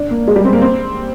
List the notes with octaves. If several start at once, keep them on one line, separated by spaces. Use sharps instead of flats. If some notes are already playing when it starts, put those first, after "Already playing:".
Already playing: D4
A#3
G#3
G3
C4
A#3
C4